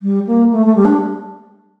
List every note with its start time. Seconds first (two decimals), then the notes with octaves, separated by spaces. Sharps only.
0.02 G3
0.27 A#3
0.51 A3
0.66 A3
0.75 G3
0.85 D4